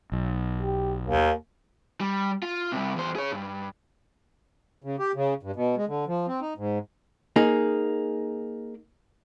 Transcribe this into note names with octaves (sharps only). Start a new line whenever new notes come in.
B1
G4
D#2 A#3
G3
F4
C2 C3
E2 C5
G#4 C#5
G2
C#3
G4
C#3
G2
B2
G#3
D3
F3
C4
D#4
G#2
A#3 D#4 G#4